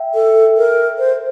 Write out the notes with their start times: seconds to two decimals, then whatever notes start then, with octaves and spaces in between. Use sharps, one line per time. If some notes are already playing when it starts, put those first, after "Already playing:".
Already playing: E5 G5
0.15 A4
0.57 A#4
0.99 C5